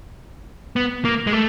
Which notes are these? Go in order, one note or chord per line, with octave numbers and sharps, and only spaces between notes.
B3
A#3
G#3
A3